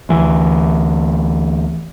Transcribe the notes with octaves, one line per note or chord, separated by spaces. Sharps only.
D2 E3